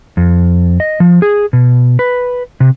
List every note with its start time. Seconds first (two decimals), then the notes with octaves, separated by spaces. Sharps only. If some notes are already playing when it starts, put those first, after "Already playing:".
0.17 F2
0.80 D#5
1.00 F3
1.22 G#4
1.53 B2
1.99 B4
2.60 C3